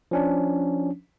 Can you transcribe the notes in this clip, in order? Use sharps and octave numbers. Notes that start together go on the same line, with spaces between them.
F3 C#4 D4